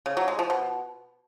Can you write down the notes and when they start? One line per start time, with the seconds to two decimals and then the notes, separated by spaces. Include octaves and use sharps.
0.06 C#3
0.17 F#3
0.28 G#3
0.39 F3
0.50 B2